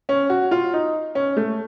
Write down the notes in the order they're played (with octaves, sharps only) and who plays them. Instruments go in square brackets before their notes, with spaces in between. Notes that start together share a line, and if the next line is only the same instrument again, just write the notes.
[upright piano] C#4
F#4
F4
D#4
C#4
A3